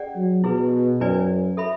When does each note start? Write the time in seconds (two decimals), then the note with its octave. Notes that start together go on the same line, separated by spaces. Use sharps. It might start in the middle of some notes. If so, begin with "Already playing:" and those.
Already playing: C#4 G#4 D5 F#5
0.16 F#3
0.44 B2 E4 G#4 B4
1.00 F#2 C#4 E4 B4 D5 G#5
1.57 A4 E5 B5